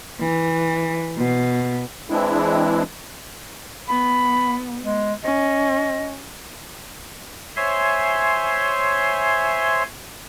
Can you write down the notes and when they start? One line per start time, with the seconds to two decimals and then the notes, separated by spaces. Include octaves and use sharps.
0.21 E3
1.17 B2
2.10 E3 G#3 C4 D4 E4
3.89 B3 B5
4.82 G#3
5.24 C#4 D#5
7.56 C5 C#5 E5 G#5 C6